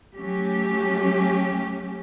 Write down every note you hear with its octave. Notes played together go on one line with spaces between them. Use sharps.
F#3 A3 C#4 G4